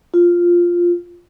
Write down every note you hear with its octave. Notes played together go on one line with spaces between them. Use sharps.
F4